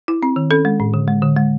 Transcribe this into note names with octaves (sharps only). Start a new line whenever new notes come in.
E4
C4
D#3
C#4 A4
G#3
A2
D3
G#3
D3
G#3